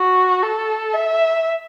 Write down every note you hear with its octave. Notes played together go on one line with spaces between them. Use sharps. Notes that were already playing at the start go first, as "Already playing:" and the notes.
Already playing: F#4
A4
E5